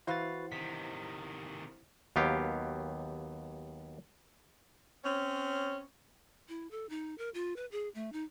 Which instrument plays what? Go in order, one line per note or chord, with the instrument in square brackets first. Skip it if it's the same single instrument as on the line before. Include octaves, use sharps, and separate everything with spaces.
[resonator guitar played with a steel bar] E3 F5 [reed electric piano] E4 C5 F#5 [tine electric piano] F#4 B4 A6
[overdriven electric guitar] C3 D#3 [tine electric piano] B6
[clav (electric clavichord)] D#2 F#3 B3 G4 F5 G5
[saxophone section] C4 C#4
[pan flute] E4
A4
D#4
A#4
F4
B4
G#4
A3
D#4